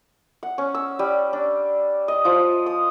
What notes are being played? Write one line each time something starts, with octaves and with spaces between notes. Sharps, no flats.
F#5
C#4
E6
G3
D4
D#5
F3
D#6